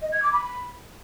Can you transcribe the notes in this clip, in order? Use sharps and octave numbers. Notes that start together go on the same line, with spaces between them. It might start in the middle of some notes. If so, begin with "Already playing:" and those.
D#5
G#6
D6
B5